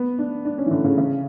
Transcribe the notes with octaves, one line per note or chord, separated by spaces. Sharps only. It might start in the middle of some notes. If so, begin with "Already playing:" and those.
Already playing: B3
D4
D4
C#4
E3
D3
C#3
C#3